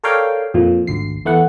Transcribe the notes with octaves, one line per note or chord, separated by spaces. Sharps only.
A4 A#4 C#5 D5 F5 G5
F2 A#2 F3
G#1 D2 C7
E2 A3 B3 F#5